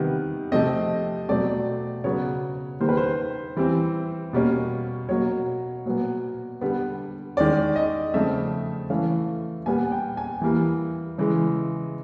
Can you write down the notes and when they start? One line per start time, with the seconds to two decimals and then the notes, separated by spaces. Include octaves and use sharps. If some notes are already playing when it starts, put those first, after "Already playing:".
Already playing: C3 D#3 G3 B3
0.52 C3 F3 A3 C4 D#5
1.29 B2 F#3 A3 C4 D5
2.04 C#3 F#3 B3 C#5
2.80 D#3 G3 A#3 C5
2.89 B4
2.97 C5
3.56 E3 G3 C4
4.33 B2 G3 A#3 C#4
5.09 B2 F#3 A#3 C#5
5.86 A#2 F#3 B3
6.61 D3 G3 B3
7.37 D#3 G#3 C#4 D5
7.76 D#5
8.14 C#3 F3 A3 C4 E5
8.90 E3 A3 C#4 F5
9.66 A#2 G3 B3 G#5
9.92 G5
10.17 G#5
10.42 E3 G3 A#3
11.18 C#3 E3 G#3